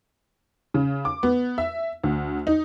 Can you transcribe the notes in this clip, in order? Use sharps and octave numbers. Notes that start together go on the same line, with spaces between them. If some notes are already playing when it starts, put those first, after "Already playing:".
C#3
D6
B3
E5
D2
D#4